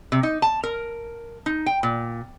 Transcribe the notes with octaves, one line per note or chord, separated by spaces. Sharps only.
C3
D#4
A5
A#4
D#4
G5
A#2